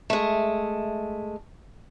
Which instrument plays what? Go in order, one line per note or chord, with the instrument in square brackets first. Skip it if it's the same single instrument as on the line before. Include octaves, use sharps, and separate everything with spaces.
[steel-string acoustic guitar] G#3 A3